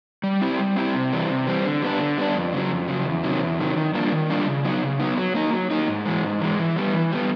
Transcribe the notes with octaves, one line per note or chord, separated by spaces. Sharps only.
G3
C4 E4 G4
G3
C4 E4 G4
C3
E3 G3 C4
C3
E3 G3 C4
D3
G3 B3 D4
D3
G3 B3 D4
F2
C#3 F#3
F2
C#3 F#3
E2
C3 D#3 F#3
E2
C3 D#3 F#3
D#3
G3 A#3 D4 F4
D#3
G3 A#3 D4 F4
C#3
F#3 B3 D#4
C#3
F#3 B3 D#4
F#3
A#3 D#4
F#3
A#3 D#4
G#2
E3 G#3
G#2
E3 G#3
E3
G3 B3
E3
G3 B3